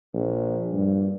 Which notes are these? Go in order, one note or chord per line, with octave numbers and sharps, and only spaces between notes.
A#1
G2